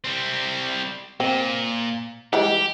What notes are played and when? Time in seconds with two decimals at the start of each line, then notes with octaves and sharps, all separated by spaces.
0.04 G3 C4
1.20 A#2 C4
2.33 E3 G3 G#3 G4